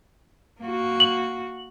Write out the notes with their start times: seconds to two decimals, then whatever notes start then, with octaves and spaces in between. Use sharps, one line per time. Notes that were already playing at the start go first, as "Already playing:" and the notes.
0.61 A#3 F#4
1.00 F#7